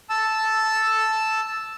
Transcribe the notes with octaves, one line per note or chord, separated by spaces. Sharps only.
A5 E6